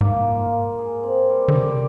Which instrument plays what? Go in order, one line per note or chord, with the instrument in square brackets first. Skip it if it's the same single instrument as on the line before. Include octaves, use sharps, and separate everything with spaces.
[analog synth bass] G#2 [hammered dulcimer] A#3
[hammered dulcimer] F4
A#3
G#4
C4
G3
[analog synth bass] D3
[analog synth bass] C3 [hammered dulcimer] D5